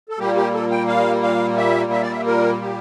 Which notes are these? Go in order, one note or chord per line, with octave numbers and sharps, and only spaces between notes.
A4
A#2 G3 A#3 G4
G4
A4
G5
F5
F5
E5
E5
D5
E5
A#4
G4